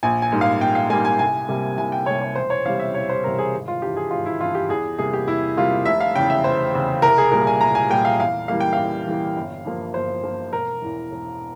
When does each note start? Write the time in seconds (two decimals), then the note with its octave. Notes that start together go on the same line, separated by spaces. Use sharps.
0.03 A#1 G#5
0.22 G#5
0.32 G#2 G3 A#3
0.41 F5
0.61 A#1 G5
0.75 F5
0.90 G#2 G3 A#3 G#5
1.05 G#5
1.19 C2 G#5
1.48 C3 G3 A#3
1.78 C2 G#5
1.92 G5
2.06 C3 G3 A#3 C#5
2.21 C#5
2.35 E1 C5
2.50 C#5
2.65 E2 C3 G3 F5
2.79 E5
2.94 E1 C#5
3.09 C5
3.24 E2 C3 G3 A#4
3.38 G#4
3.53 G#1
3.68 F4
3.82 G2 E3 G4
3.97 G#4
4.11 G#1 F4
4.26 E4
4.40 G2 E3 F4
4.55 G4
4.69 E2 G#4
4.98 C3 G3 A#3 G#4
5.13 G4
5.27 E2 E4
5.57 C3 G3 A#3 F4
5.85 F1 E5
6.00 F5
6.16 E2 C#3 G5
6.30 E5
6.44 F1 C5
6.74 E2 C#3
7.02 C2 A#4
7.18 G#4
7.31 A#2 G3 A#4
7.47 G#5
7.61 C2 A#5
7.75 G#5
7.90 A#2 G3 G5
8.05 F5
8.19 E2 F5
8.48 E3 G3 A#3 F5
8.60 G5
8.73 E2 F5
9.07 E3 G3 A#3
9.36 G1
9.65 G2 F3 A#3
9.94 G1 C5
10.23 G2 F3 A#3
10.52 E1 A#4
10.82 E2 E3
11.11 E1